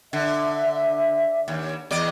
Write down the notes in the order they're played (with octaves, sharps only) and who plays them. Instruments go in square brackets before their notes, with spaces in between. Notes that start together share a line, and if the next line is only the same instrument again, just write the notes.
[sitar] D3 [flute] E5
[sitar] D#2
E2 D5 D#5